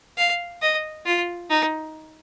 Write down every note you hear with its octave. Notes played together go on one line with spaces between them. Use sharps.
F5
D#5
F4
D#4